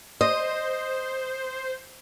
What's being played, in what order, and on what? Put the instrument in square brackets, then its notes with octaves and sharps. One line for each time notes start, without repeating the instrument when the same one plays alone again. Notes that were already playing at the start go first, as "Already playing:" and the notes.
[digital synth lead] C5 [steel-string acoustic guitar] D#5